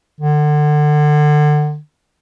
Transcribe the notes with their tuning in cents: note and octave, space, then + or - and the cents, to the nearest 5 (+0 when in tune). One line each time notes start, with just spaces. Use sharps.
D3 +30